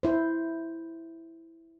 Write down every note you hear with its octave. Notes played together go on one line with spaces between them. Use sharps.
E4 C5